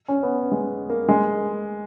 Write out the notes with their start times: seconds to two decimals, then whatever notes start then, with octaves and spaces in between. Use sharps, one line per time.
0.08 C#4
0.23 B3
0.52 G#3
0.90 A#3
1.08 G#3